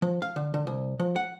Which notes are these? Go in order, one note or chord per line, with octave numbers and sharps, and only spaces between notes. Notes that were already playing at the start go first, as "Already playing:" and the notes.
F3
F5
D3
D3
C2
F3
F#5